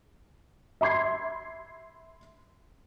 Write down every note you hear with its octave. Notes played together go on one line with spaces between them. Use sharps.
E5 B5 C6 G#6 C7